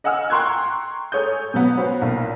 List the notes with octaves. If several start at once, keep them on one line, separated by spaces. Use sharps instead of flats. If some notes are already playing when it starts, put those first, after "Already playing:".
D#5 F#5 G#5 E6 F6
G5 A#5 C6 C#6 F#6 G#6
G#4 A4 C#5 D#6 G6
B2 F#3 B3
C#4 F#4 B4 C5
B1 A#2